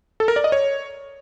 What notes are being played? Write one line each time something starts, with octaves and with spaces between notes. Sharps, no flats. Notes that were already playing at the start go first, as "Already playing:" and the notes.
A4
A#4
D5
D#5
C#5